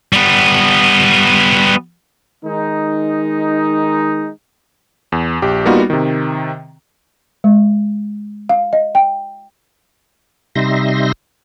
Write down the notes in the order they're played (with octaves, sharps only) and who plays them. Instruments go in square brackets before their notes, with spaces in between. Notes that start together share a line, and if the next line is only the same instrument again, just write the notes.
[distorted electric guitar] G3 B3
[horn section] D#3 G#3 D#4
[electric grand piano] E2
A#1 G4
G3 A#3 B3 D#4 F4 F#4
C3 D#3
[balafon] G#3
F5
D#5
G5
[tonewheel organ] C3 G3 D#4 E5 C6 A#6